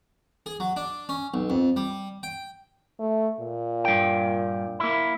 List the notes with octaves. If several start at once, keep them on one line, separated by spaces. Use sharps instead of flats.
G#4
F#3
D4
C#4
B1
F2
G3
G5
A3
A#2
G2 G5
A#3 E4